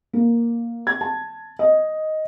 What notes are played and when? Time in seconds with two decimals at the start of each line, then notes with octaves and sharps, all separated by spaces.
0.13 A#3
0.87 G#6
1.01 A5
1.59 D#5